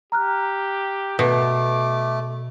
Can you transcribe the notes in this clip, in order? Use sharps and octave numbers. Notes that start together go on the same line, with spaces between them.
G4 A#5 F6 F#6
B2 A3 D6